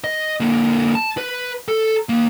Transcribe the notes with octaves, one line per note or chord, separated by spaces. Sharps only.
D#5
D3 A#3
A5
B4
A4
D#2 A#3